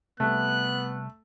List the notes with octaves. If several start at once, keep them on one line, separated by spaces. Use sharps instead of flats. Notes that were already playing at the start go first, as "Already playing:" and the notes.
C3 G3 A3 B3 F#6